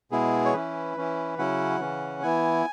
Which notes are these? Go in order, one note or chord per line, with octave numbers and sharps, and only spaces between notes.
B2 G#3 B3 E4 G#4
C#5
E3 C#4 E4 B4
E3 C#4 E4
C#3 F#3 C#4 E4 F#5
C#3 E3 C#4
E3 B3 E4 G#5